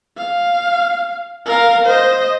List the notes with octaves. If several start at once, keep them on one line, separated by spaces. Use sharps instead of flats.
F5
A#4 F5
C5 D#5